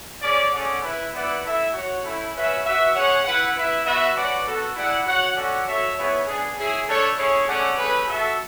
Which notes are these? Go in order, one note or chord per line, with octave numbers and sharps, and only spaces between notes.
C#4 G#4 D5
A3 C#4 G#4 D5 F#5
E4 B4 E5
B3 E4 B4 D5 F#5
E4 A4 E5
F#4 C#5 F#5
A3 C#4 E4
C#4 F#4 B4 E5
F#4 B4 E5
C#4 G#4 C#5 F#5
E4 B4 F#5
E4 B4 E5
B3 F#4 B4 E5
C#4 F#4 B4 D5 F#5
B3 F#4 A4
E4 G#4 D5 F#5
F#4 C#5 F#5
C#4 F#4 A4 D5 F#5
F#4 A4 C#5 E5
B3 E4 G#4 C#5 E5
B3 D4 G#4
C#4 E4 G#4
A3 D4 A4 C#5
A3 C#4 E4 G#4 C#5
A3 C#4 G#4 D5 F#5
A3 C#4 G#4 B4
F#4 A4 E5